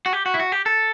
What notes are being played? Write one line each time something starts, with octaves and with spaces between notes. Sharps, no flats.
F#4
G4
F#4
E4
F#4
G4
A4